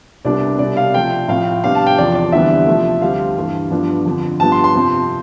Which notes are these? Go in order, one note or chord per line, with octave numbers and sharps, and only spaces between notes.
C2 C3 G3 B3 D4 D5
C2 B2 G3 D5
F5
C3 F3 A3 C4 G5
A2 F3 C4 F5
C3 G3 B3 D4 F5
A5
G5
E2 C3 F3 D5
D5
D2 C3 E3 G3 B3 E5
C3 F3 A3
D2 D3 G3 C4 F5
G2 E3 A3
G2 F3 B3 D4
F2 D3 F3
G2 F3 B3 A5
C6
C6
F2 C3 F3 C4